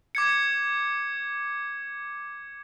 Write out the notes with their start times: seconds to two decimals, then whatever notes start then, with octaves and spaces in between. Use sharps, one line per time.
0.15 D6 G#6 C#7